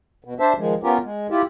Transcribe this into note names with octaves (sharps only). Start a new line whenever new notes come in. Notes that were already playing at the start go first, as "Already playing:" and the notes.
B2
D4 C5 E5 A5
D#3 F3 G#3
B3 C#4 F4 G4 A#4
G#3
E4 F4 G4